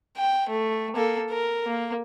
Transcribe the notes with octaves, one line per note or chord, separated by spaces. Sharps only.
G5
A3
A#3 A4
A#4
A#3